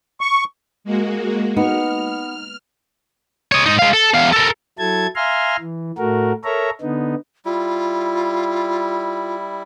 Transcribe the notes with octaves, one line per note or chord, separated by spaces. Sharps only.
C#6
G#3 A#3 F#4
B3 D#4 F6
C#5 D#5
G#2 D#4
G#3 F5
A4
E2 F5
A4 A#4
F#3 E4 A4 A5 G#6
E5 F5 G#5 A#5 C6 F6
E3
A2 A3 F#4 A#4
A4 A#4 C#5 E5 A#5
D3 B3 D#4
G3 E4 F4